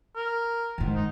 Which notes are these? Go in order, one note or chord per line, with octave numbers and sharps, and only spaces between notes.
A#4
G#2 D#3
D#4